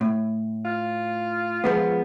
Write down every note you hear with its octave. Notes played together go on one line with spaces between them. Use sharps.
A2
F4
F3 G#3 B3